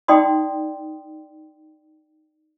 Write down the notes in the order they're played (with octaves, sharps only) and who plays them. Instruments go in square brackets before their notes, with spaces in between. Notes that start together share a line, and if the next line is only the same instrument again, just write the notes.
[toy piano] D#4 D5 F#5 G5 C6 D#6